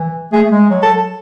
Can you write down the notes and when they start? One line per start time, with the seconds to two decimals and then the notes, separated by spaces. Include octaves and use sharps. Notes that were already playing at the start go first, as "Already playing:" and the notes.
Already playing: E3
0.32 A3 G#4
0.44 A3
0.51 G#3
0.70 F#3
0.83 A4